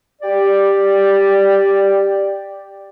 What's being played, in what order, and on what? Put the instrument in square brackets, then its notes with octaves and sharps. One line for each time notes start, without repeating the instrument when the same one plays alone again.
[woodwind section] G4 D5